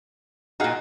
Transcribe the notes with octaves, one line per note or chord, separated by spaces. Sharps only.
A#2 D#4 F#4 G#4 F5